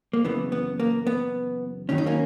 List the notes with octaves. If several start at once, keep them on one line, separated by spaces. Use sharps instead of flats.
A#3
F#2 C#3 E3 B3
B3
A#3
B3
D#2 D#3 F#3 C#4
D#4
A#3 C#4